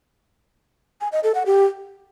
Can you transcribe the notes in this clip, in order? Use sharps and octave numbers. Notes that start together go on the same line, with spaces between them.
G#5
D#5
A4
F#5
G4